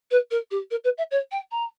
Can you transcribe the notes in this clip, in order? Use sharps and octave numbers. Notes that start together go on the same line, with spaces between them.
B4
A#4
G4
A#4
B4
E5
C#5
G5
A#5